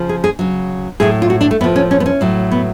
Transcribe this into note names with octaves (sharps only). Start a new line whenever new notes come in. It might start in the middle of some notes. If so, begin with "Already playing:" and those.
Already playing: C#3 F3
G#4
G#4
C#3 F#3
A2 F#3 G#4
F4
F#4
D4
A3
A2 F3 B3
C#4
C#4
B3
C#4
A2 F#3
B3